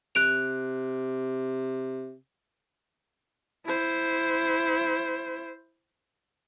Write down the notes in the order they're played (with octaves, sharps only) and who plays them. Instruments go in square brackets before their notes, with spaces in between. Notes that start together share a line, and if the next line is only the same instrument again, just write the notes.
[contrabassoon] C3 [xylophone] F#6 D7 F7
[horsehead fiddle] E4 C5